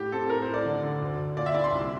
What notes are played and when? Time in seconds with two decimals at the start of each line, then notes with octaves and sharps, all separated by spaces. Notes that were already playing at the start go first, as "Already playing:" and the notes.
Already playing: A2 G4
0.12 C4 A4
0.24 A4
0.29 A2 A#4
0.42 C5
0.47 A2
0.54 D5
0.65 D3
0.83 D3
1.02 D2
1.18 D2
1.37 A#2 D5
1.46 E5
1.54 E4 D5
1.64 C6
1.72 C2